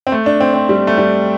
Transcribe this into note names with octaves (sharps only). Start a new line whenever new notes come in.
C4
A3
D4
C4
C4
G3
A3
G3